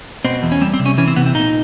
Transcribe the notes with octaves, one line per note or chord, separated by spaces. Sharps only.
B2 C4
E2
C#4
G3 C4
C4
C3
C#4
E3 C#4
C4
C3 B3
C4
A#2 D#4